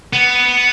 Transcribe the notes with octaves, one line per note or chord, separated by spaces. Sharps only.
B3